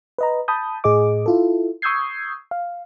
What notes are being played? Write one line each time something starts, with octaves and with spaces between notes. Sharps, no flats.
B4 D#5 A#5
A5 B5 D#6 G6
A2 G#4 D#5 D6
E4 F4 A4
C#6 D#6 E6 G6 G#6 C7
F5